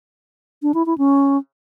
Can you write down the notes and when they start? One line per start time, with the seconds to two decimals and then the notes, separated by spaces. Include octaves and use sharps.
0.63 D4
0.74 E4
0.86 E4
0.98 C#4